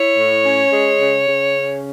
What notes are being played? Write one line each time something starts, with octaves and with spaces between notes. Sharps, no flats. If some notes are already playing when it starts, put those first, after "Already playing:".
Already playing: E4 C#5
A2
C#4
G#3
C#3
C#3
C#4